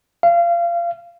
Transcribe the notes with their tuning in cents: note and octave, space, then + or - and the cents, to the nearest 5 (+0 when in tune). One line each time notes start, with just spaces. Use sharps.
F5 -25